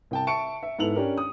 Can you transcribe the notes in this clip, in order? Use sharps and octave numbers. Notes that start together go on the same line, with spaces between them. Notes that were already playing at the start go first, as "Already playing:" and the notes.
C2 G5 A5
E5 A5 C#6 C#7 D7
E5
G#2 B3 E4 A4 F7 F#7
C#4 D4 G4 A#4
D#6